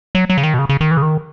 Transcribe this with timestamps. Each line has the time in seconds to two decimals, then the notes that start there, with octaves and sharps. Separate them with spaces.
0.15 F#3
0.30 F#3
0.38 C#3
0.43 D#3
0.54 B2
0.59 C#3
0.69 C#3
0.81 D#3
0.91 E3
0.97 C#3
1.02 D#3